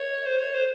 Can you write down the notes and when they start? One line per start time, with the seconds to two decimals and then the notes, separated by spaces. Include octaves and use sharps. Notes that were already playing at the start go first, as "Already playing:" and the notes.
Already playing: C#5
0.26 C5
0.40 C#5
0.54 C5